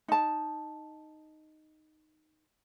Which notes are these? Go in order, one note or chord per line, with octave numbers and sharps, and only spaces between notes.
D#4 A5